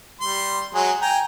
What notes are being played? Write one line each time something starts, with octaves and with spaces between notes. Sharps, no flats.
G3 C6
F#3 G#3 G#4
G5 G#5 A#5